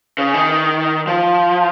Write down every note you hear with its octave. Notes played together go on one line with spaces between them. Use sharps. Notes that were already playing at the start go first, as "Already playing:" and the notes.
C#3
D#3
F3